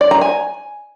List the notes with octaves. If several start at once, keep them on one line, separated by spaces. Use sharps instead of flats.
D5
A#5
G#5